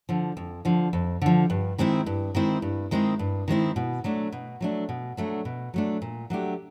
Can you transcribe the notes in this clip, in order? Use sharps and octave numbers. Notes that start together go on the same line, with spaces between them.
D3 F3
F2
D3 F3
F2
D3 F3
G2
D#3 G#3 C4 E4
G2
D#3 G#3 C4 E4
G2
D#3 G#3 C4 E4
G2
D#3 G#3 C4 E4
B2
F#3 A3 D4
B2
F#3 A3 D4
B2
F#3 A3 D4
B2
F#3 A3 D4
A#2
F#3 A3 D4 G4